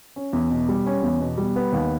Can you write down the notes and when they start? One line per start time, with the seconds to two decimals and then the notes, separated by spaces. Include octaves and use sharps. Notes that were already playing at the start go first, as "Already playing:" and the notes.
0.16 C#4
0.33 E2
0.50 B2
0.69 G3
0.86 C#4
1.03 E2
1.21 B2
1.38 G3
1.56 B3
1.73 D#2